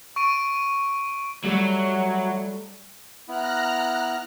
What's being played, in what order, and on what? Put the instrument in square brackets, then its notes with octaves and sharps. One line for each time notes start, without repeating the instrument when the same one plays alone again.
[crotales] C#6 D7 D#7
[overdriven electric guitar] F#3 [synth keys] G3 A3
[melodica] B3 E4 [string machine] A#5 F6 F#6